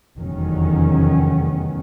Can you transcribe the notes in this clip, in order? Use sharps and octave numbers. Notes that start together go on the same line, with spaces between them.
F1 E2 D#3 F#3 C#4